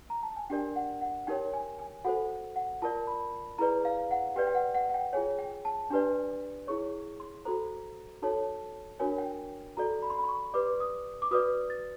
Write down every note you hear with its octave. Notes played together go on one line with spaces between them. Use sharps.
A#5
A5
G#5
D4 G4 A#4 D5 G5
F#5
F#5
D#4 G4 A#4 C#5 G5
G#5
G#5
F#4 A4 C5 F#5
F#5
F4 A#4 D5 A5
B5
E4 G#4 B4 D5 A#5
F5
F#5
G4 B4 D5 G5
G5
F#5
F#5
F#5
G5
F4 G#4 C#5 G#5
G5
A5
D4 G4 B4 D5 G#5
E4 G#4 C#5 C#6
C6
F#4 A4 C5 A#5
D#4 F#4 A4 C#5 A5
D4 F#4 A#4 C#5 G#5
G5
F#4 A4 D5 A#5
B5
C6
B5
C6
C#6
G4 B4 D5 D6
D#6
D6
F#4 B4 D5 D#6
A6